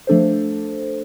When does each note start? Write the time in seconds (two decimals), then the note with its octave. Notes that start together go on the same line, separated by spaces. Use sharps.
0.07 F3 A3 D4 A4 C5